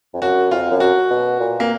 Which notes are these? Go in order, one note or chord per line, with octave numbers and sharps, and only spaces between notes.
F2
F#2 F#4
F2 F4
F#2
F#4
B2
A#2
A#3